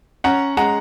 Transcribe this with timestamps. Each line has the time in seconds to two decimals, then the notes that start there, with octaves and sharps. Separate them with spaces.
0.24 C#4 F#5 A#5
0.57 G#3 F#5 A#5